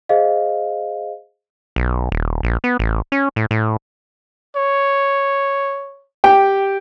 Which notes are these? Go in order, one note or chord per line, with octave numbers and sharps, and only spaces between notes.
G#4 C5 D#5 F5
B1
D#1
A#1
B3
A1
C#4
A2
A2
C#5
G4 G5